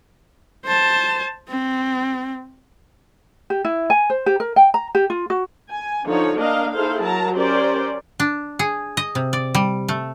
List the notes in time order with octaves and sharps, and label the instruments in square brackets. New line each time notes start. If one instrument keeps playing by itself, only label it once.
[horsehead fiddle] C5 A5
C4
[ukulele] G4
E4
G#5
C5
G4
A#4
G5
A#5
G4
F4
F#4
[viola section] G#5
D3 F3 D#4 C#5
A#3 D4 A#4 D#5 F5
D#4 E4 G#4 A4 C5 F5
F#3 A#4 A5 A#5
C#4 G4 A#4 C5 D5
[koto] D4
G#4
D#5
C3
D5
G3
A3